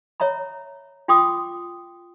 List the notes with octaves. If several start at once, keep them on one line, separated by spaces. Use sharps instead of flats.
C#5 E5 A#5 B5
F4 G5 C6 D6 D#6